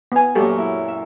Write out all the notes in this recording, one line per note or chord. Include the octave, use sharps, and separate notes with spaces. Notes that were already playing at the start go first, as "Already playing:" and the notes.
B3 G#5
F#2 A#2 F#3 G4 A4
E4
E5